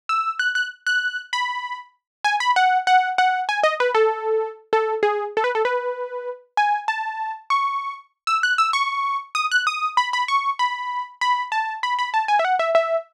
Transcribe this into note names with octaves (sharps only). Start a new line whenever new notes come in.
E6
F#6
F#6
F#6
B5
G#5
B5
F#5
F#5
F#5
G#5
D#5
B4
A4
A4
G#4
A4
B4
A4
B4
G#5
A5
C#6
E6
F#6
E6
C#6
D#6
F#6
D#6
B5
B5
C#6
B5
B5
A5
B5
B5
A5
G#5
E5
F#5
E5
E5